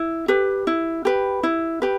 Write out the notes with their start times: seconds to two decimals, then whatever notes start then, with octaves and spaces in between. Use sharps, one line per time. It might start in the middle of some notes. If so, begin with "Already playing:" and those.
Already playing: E4
0.28 G4 B4
0.67 E4
1.05 G4 B4
1.43 E4
1.82 G4 B4